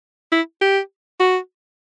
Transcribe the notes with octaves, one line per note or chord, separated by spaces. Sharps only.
E4
G4
F#4